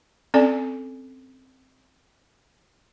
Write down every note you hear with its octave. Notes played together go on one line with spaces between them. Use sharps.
C4 C#4 A4 D5 G#5